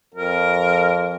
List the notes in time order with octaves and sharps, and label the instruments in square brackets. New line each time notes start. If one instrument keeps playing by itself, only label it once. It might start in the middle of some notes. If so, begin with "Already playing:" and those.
[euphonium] F2 [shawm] A#4